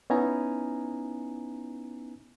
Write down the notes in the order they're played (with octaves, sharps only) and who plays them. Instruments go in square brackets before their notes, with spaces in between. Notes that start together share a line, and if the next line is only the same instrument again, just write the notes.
[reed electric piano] B3 C#4 D#4 E4 G#5 A#5